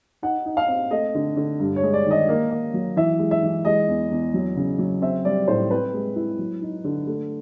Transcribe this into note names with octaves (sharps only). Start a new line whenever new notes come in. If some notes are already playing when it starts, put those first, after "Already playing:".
D#4 F#5
D#4
F5
C4
A3 D#5
D3
D3
G2
C#5
G#3
D5
D#3
D#5
A#3
A#3
F#3
E3 E5
G#3
E5
E3
G#3 D#5
E2
E2
F#3
C#3
F#3
C4 E5
G3 D5
A2 C5
C4 B4
G#3
E4
F#3
D#4
D3
A3